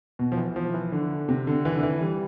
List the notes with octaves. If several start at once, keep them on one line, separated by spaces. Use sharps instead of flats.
B2
F3
E3
F3
E3
D3
C3
D3
E3
D3
E3
G3